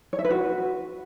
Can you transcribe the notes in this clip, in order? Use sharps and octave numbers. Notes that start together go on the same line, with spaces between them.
C#5
E5
B4
F#4